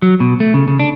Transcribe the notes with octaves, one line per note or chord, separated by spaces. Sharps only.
F#3
B2
A3
C#3
C#3
D4